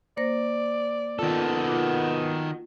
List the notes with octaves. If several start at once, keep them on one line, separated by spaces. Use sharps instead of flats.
A#3 C5 D5 A#6
D#3 B3 F4 A4
F4 F#4 D6